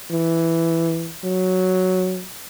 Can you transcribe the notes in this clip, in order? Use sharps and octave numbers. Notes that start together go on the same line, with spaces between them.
E3
F#3